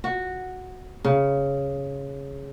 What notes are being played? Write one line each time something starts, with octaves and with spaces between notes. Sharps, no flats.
F#4
C#3